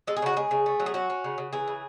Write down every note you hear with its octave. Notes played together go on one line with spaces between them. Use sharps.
G#3 A4
G#4
C#3 F#4
G#3 G#4
C#3
A3
F#3
G#4
C#4 F#4
C#4
C#3
C#3
E3 G#4
C#3